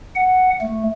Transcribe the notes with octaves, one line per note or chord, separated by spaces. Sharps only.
F#5
A3